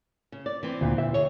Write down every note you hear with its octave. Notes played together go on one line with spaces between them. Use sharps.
C#3
D5
E3 C4
D2 A#2
E5
G#4 C#5